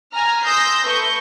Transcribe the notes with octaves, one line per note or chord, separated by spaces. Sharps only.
G#5 A#5 F6
C6 D#6 E6 G6 A#6
A3 B4 C#6 G6